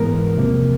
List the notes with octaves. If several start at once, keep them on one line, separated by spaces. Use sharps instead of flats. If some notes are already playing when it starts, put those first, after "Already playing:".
Already playing: G#2 E3 G#3 B3 A#4
E2 C3 F3 A#3